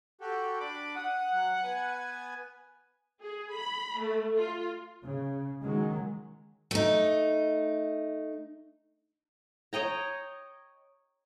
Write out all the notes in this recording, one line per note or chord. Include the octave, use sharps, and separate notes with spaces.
F#4 G4 A4
D4 B5 D6
F#5 D#6
F#3
B3 B4 G#5
G#4
B5
A3
F4
C#3
D#3 F#3 G#3
A3 D#4
C#5 D#5 G5 A#5